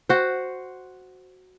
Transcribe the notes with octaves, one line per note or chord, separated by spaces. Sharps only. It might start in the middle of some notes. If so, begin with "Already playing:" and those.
F#4 C5